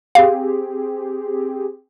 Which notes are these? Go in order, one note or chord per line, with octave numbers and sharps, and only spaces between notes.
C4 G4 G#4 F5